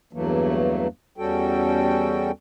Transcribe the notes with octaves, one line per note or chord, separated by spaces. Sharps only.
E2 G2 E3 F#3 A3 A#3
E2 G3 C#4 F#4 A4 G5